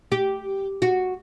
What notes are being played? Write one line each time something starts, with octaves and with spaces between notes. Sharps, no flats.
G4
F#4